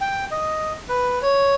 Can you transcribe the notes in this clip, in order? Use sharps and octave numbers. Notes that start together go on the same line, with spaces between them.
G5
D#5
B4
C#5